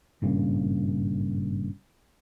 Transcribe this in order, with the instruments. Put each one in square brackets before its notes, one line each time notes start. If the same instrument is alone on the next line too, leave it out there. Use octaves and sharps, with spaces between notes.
[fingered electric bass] G#1 G2 A#2 C#3